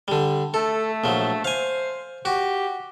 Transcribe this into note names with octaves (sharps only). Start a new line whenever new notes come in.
D3 G3
A3 A4
A#1 F3 F#3
C5 F5 G#5
F#4 G4